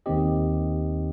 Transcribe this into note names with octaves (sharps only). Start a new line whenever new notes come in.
D#2 D#3 C4 G4 D#5